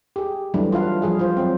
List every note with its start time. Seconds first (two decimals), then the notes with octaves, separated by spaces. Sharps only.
0.16 G4 G#4
0.54 E3 F#3 G3 A3 D4
0.72 F4 B4 F5 F#5
1.02 F3 G3 G#4 F5
1.19 F4 C5
1.37 F#3 C4